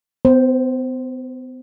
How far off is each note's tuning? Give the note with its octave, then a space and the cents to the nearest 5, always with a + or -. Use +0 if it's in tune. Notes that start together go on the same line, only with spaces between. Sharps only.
B3 +45 C5 +0